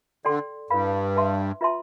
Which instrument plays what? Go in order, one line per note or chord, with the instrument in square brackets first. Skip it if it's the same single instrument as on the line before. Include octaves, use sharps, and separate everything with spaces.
[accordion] D3 [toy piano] A4 D5 G5 C6
[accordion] G2 [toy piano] E4 B4 F5 B5
[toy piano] B4 E5 A5 C6
F4 B4 E5 A5 C6